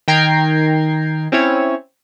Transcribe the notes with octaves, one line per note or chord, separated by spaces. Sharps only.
D#3 G5 A#5 G#6 C7
C4 C#4 E4 C#5